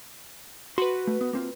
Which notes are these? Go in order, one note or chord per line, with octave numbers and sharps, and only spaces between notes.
F#4 B4 C6
A3
B3
A#3 C4 F4